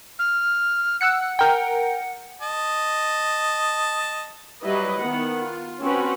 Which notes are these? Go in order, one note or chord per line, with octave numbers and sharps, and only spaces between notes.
F6
F#5 E6 F#6 C#7
A#4 G5
D#5 A5
F#3 G3 E4 B4 D#5
D#3 B3 F#5
F4
C4 C#4 F#4 B4